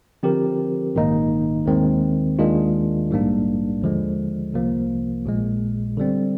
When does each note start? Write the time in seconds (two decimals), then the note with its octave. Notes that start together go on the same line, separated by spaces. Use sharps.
0.23 D3 F3 C4 G4 A#4
0.95 A#1 G#2 D#3 A#3 D#4
1.66 D#2 D#3 G#3 C4
2.39 D#2 D#3 G#3 D4 F4
3.11 A#1 G#2 G3 A#3 D4
3.82 D#2 D3 F3 G#3
4.54 C2 C3 F3 A#3
5.25 A#1 A#2 G#3
5.98 D3 G3 C4